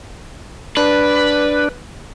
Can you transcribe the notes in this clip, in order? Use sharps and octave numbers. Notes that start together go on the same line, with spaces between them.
D4 B4